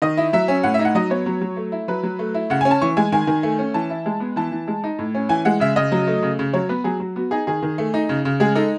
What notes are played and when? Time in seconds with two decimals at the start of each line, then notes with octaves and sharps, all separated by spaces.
0.02 D#3 D#5
0.17 E4
0.33 F#3 E5
0.48 C#4
0.63 A2 F#5
0.74 E5
0.79 D#4
0.85 F#5
0.95 F#3 D#5
1.10 B3 C#5
1.26 F#3
1.41 F#3
1.57 A3
1.72 E4
1.88 F#3 B4
2.03 F#3
2.19 A3
2.34 E4
2.50 C#3 F#5
2.61 G#5
2.65 C#4
2.71 A5
2.81 E3 C#6
2.97 G#3 G#5
3.12 D#3 G#5
3.27 D#3
3.43 A3
3.59 C#4
3.74 E3 A5
3.90 E4
4.06 G#3
4.20 B3
4.36 E3 A5
4.52 E3
4.68 G#3
4.84 D#4
4.99 A2
5.15 C#4
5.29 E3 G#5
5.45 G#3 F#5
5.60 C#3 E5
5.76 C#3 D#5
5.92 F#3
6.07 A3
6.23 C#3
6.39 C#3
6.53 F#3 C#5
6.69 B3 B4
6.84 F#3 G#4
7.00 F#3 F#4
7.16 B3 F#4
7.31 D#4 G#4
7.47 D#3 G#4
7.63 D#3
7.78 A3
7.94 D#4
8.09 C#3
8.25 C#3
8.40 G#3 G#4
8.55 D#4 A4